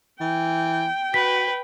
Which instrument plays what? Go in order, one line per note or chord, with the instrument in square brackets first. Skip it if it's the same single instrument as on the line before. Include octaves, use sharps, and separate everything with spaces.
[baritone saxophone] E3 [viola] G5
[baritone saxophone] F#4 [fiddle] B4 [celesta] B6